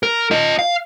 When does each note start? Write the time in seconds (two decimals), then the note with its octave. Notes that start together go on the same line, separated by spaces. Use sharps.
0.03 A#4
0.31 F4 D#5
0.59 F5